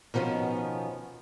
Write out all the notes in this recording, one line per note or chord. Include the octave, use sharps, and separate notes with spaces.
B2 D#3 F3 B3 C#4